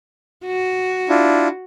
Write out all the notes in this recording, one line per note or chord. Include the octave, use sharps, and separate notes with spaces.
F#4
D4 E4 F4